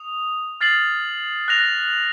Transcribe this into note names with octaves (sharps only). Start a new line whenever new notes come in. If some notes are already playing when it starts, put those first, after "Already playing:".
Already playing: D#6 F7
F6 A6 C7 F#7
F#6 A#6 F7